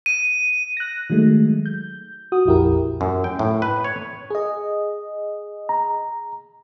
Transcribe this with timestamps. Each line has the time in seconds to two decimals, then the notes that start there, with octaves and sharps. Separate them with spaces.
0.06 D#7
0.77 F#6 A#6
1.10 D#3 F#3 G#3 A3
1.66 G6
2.32 F#4 D#6
2.45 A#1 F2 E4 G4 A#4
3.01 F#2
3.24 G5
3.39 A2
3.62 B4
3.84 C#5
4.30 G#4 D#5
5.69 A#5